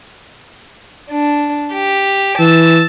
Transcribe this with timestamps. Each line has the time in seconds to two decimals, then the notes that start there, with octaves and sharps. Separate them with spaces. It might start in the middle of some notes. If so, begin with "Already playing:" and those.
1.11 D4
1.73 G4
2.39 E3 A5 E6